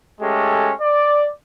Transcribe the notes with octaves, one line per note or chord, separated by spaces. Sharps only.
G#3 A3 C#4 G4 A4
D5